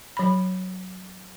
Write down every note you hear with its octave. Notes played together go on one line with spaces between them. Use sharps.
F#3 B5